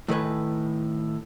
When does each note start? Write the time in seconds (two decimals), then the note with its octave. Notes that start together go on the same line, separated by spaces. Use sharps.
0.08 A2 D#3 A4 B4 G#5